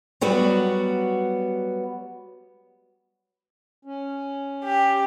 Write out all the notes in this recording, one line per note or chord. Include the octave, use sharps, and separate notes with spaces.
F#3 G3 B3 F#4
C#4
G4